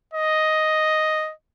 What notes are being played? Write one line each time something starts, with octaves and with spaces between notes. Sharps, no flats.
D#5